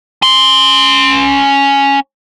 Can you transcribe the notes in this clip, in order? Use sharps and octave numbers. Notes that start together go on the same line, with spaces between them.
C#4 C6